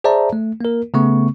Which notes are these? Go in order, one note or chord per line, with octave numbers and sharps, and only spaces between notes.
G#4 C5 D5 E5 A5 A#5
A3
A#3 A#4
C#3 A3 B3 C#6